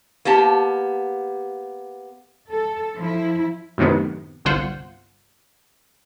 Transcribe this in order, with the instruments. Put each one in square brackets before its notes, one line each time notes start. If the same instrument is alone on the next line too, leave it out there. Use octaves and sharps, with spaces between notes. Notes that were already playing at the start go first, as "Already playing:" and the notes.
[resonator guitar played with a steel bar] A#3 B3 G4 A5
[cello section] A4
F3 E4
[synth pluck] F#2 A2 C3 D#3 B3
G1 C2 D3 F4 C5 F#5